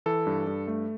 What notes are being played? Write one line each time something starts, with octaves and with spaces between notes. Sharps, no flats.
E3 A4
G2
G2
A3